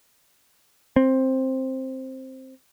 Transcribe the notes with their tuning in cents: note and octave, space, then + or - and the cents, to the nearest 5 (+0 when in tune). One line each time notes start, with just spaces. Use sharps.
C4 +10